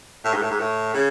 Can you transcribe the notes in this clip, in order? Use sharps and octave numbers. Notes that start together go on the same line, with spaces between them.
A2
G#2
A2
G#2
A2
C#3